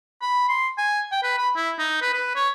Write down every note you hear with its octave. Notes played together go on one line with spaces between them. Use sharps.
B5
C6
G#5
G5
B4
B5
E4
D#4
B4
B4
C#5